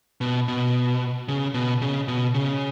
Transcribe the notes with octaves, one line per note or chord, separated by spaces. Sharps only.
B2
B2
C#3
B2
C#3
B2
C#3